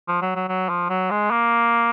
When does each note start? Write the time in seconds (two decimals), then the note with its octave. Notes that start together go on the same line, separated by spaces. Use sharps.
0.08 F3
0.22 F#3
0.36 F#3
0.48 F#3
0.69 F3
0.90 F#3
1.11 G#3
1.31 A#3